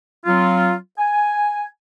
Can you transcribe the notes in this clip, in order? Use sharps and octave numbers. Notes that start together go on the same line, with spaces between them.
F#3 C4 F4
G#5